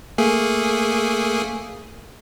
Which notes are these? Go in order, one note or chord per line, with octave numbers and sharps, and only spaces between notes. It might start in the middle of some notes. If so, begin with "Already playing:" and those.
A3 A#3 G#4